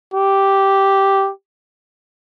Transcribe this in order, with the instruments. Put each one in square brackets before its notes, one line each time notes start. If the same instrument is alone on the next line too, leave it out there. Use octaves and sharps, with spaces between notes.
[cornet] G4